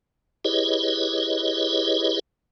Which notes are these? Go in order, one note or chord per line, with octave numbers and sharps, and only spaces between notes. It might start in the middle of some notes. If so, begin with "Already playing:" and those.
E4 G4 G#4 B4 C#5 D#5